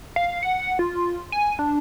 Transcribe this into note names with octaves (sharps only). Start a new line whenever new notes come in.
F5
F#5
F4
G#5
D4